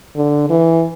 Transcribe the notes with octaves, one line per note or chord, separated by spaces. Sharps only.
D3
E3